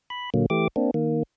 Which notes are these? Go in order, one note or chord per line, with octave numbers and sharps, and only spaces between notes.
B5
A#2 D3 F#3 A#3
E3 A3 G4 D6
A#3 C4 D4
D#3 A#3